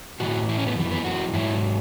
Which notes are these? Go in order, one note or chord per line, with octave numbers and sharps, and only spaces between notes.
A2 E3 F#4
E4
C#4
B3
F#2 E3
B3
F#4
G#2 F#3 E4